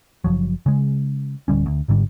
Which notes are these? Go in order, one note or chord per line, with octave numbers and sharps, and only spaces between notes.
F#1 D#2 F3 F#3
C#3 G#3
D1 D3 G3 C#4
D2
G#1 G#2 D3 G3